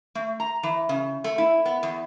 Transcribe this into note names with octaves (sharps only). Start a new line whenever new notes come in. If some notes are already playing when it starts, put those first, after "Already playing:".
A3
A#5
E3
C#3
A3
E4
B3
E2